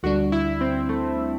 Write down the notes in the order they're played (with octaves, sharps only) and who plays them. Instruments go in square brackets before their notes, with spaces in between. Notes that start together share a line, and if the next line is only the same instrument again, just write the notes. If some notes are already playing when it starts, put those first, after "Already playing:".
[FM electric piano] D2 D3 G3 D4 [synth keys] F#4
[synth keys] E4
C4
A3